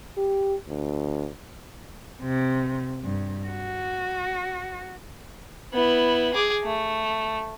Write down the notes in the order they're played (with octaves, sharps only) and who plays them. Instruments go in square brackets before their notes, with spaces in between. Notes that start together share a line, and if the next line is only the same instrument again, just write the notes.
[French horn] G4
D2
[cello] C3
G2
F#4
[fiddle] B3 E4
G#4 D6
A3